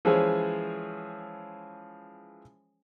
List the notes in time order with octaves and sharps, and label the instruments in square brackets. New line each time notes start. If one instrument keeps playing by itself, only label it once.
[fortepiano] E3 F3 G#3 C#4 G#4 C5